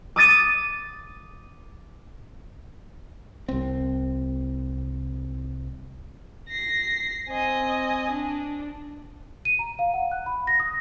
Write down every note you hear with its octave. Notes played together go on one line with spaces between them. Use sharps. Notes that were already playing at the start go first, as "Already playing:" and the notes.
D6 D#6 A6 D#7
C2 C4
A#6 C7
C4 D#5 G#5
D4
D#7
A#5
F5
F#5
F#6
B5
A#6
D#6